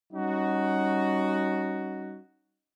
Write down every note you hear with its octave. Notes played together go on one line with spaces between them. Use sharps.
G3 C#4 D#4 F#4